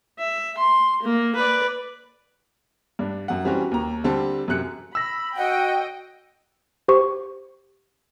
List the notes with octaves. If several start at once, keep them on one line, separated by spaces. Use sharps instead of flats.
E5
C6
A#3
B4 D5
G2 D4
F#2 F#5
E3 G3 C4 C#4 F#4
D#2 A#5
D3 G3 C4 A4 A5
F#2 C3 F#6 C#7
B5 E6 A#6
F#4 D#5 F#5 G5
G4 C5 C#6